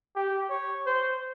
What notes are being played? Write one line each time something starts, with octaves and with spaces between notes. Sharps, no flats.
G4
C#5
C5